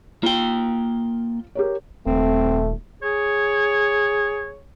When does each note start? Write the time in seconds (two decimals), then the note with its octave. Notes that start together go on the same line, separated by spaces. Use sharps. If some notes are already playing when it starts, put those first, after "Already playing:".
0.23 A#3 F4 G5
1.55 G4 A#4 C#5
2.06 D#1 A3 C4
3.03 G#4 C#5